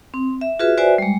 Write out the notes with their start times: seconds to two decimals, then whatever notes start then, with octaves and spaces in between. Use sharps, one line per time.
0.14 C4
0.41 E5
0.59 F4 F#4 G#4 B4 E5
0.77 F#4 B4 C5 D5 E5 G#5
0.98 G3 G#3